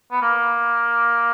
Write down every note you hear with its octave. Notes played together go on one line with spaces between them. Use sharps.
B3
A#3